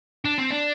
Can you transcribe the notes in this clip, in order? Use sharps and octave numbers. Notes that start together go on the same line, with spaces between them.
D4
C4
D4